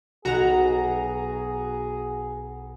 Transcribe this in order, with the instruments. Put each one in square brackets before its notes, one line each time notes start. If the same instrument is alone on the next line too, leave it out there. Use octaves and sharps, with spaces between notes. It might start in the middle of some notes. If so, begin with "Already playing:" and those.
[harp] B1 F#5 [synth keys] F#4 A#5 [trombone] G#4